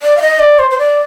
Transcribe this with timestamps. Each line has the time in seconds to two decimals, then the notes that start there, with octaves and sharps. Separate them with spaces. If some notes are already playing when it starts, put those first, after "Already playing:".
0.03 D5
0.17 F5
0.22 D#5
0.39 D5
0.59 C5
0.71 C5
0.78 D5